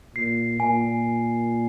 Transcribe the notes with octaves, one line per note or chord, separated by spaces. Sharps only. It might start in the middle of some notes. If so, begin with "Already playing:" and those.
A#2 C7
A#2 G#5